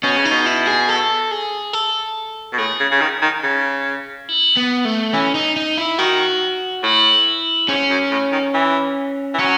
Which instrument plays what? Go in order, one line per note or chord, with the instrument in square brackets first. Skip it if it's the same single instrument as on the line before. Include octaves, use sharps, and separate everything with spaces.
[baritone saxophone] B2 [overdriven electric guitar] C#4
[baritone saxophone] C#3
[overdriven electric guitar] D#4
[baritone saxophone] B2
[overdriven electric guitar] E4
G#4
A4
G#4
A4
[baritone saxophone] B2
[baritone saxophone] A2 [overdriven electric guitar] G#4
[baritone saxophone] C#3
C#3
D#3
D#3
C#3
[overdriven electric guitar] E4
B3
A3
[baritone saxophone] E3 [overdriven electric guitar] C#4
[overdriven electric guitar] D#4
D#4
E4
[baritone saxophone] D#3 [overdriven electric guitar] F#4
[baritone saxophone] A2 [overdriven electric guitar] E4
[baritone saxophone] G#2 [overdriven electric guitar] C#4
[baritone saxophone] F#2
A2
D#3
E3
E3
[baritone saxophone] F#3 [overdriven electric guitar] C#4